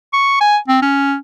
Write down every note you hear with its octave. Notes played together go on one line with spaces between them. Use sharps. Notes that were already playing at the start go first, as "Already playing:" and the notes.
C#6
G#5
C4
C#4